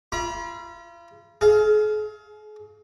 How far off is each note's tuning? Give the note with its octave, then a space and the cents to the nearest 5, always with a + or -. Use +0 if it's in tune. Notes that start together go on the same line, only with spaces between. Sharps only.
F4 -40 B5 -45
G#4 +40 F5 +0